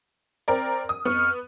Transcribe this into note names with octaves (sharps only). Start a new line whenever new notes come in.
C4 A#4 D5
D#6
F2 B3 C#6 F6